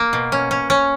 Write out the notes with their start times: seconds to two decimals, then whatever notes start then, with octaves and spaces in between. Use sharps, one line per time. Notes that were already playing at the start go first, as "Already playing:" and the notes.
Already playing: A#3
0.13 B2
0.32 C#4
0.51 C#4
0.70 C#4